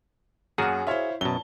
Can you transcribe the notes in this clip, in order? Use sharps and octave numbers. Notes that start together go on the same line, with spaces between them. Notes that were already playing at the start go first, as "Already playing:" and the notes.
F#2 A#3 F#4 G#4 F#5
E4 C5 C#5 E5 F5
F#2 B2 C#5 A5 G7